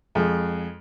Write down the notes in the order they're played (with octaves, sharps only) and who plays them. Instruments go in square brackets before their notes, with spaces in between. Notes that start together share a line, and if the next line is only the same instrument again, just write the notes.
[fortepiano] F2 G#3